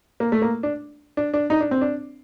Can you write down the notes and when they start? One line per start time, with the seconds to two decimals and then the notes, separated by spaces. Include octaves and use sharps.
0.20 A#3
0.32 A3
0.42 A#3
0.63 D4
1.17 D4
1.34 D4
1.50 D#4
1.60 D4
1.71 C4
1.81 D4